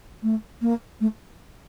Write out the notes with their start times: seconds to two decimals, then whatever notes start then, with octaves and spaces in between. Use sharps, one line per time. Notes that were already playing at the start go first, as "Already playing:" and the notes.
0.23 A3
0.62 A#3
1.01 A3